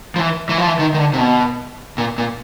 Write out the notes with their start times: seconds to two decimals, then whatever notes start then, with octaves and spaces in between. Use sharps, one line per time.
0.16 F3
0.19 E3
0.49 E3
0.58 F3
0.67 E3
0.79 D#3
0.94 D#3
0.98 D3
1.13 C3
1.18 B2
1.98 A#2
2.18 A#2